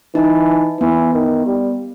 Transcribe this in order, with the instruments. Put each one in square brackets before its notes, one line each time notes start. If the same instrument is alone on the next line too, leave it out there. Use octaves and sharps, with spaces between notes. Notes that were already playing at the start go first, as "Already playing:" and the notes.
[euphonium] E3 [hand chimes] D#4
[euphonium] E3 [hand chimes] B3
[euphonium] D#3
G3